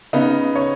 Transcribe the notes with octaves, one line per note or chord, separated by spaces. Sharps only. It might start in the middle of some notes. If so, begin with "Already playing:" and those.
C#3 B3 D#4 D#5
C#5